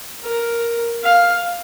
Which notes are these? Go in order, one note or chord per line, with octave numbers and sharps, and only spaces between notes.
A#4
F5